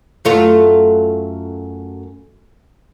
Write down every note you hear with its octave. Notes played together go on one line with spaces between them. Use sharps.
F#2 A3 F4